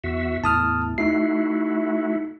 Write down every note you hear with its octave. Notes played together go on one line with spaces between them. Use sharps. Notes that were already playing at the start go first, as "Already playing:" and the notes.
E2 F#4 E5
E2 A2 A5 D#6 F6
A3 D#4 E4 F#4 C7